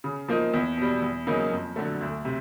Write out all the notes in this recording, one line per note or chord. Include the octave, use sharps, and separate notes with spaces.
C#3
F3 A#3 D#4
E2
B2 G3
E2
C#3 F#3 A#3 D#4
F2
D3 F#3 A3
D2
C3